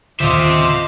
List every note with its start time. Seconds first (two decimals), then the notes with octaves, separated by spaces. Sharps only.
0.20 D#1 A#2 D3 F4 C5 D#5 E5 D6